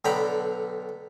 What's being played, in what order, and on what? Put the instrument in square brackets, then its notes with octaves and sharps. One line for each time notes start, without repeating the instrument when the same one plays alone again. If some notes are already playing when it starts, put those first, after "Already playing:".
[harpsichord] B1 D3 G5 A#5 B5 D6